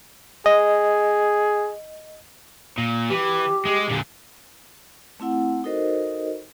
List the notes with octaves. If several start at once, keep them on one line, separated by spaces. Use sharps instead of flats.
G#4 D#5
A#2
E3 G4
G#3
A#2 D3
A3 C4 E4 F#5
D#4 F#4 A4 A#4 C5 D#5